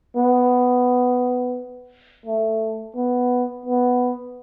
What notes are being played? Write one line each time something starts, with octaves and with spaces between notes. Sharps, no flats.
B3
A3
B3
B3